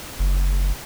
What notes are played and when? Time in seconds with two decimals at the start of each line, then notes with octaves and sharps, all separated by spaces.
0.19 F#1